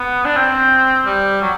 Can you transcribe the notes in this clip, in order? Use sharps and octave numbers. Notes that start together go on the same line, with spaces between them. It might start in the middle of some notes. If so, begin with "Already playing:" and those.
Already playing: B3
D4
C4
G3
F#3